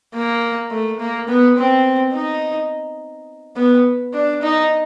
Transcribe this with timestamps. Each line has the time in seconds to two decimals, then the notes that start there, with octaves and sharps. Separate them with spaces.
0.14 A#3
0.71 A3
1.00 A#3
1.28 B3
1.57 C4
2.14 D#4
3.56 B3
4.14 D4
4.42 D#4